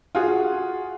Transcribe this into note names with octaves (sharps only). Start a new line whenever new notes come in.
F4 F#4 G#4